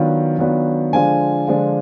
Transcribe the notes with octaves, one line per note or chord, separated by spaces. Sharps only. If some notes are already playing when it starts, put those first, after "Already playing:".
Already playing: D#3 F#3 B3 D4 F4
D#3 F#3 B3 D4 F4
D3 F3 G#3 D4 F4 G#5
D3 F3 G#3 D4 F4